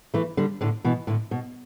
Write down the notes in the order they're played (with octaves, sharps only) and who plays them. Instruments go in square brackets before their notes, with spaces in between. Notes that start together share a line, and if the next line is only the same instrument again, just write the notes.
[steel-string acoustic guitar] E3 A3
D3 G3
A2 D3
B2 E3
A2 D3
B2